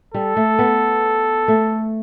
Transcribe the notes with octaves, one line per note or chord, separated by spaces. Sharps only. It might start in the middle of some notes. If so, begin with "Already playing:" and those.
G3 A4
A3
B3
A3